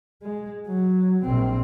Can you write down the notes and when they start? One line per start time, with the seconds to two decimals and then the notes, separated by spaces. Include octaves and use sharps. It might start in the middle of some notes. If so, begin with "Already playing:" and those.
0.22 G#3
0.68 F#3
1.24 A#1 C4